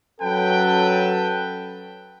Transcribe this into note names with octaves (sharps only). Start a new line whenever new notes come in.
F#3 C#4 A4 B4 G5 A5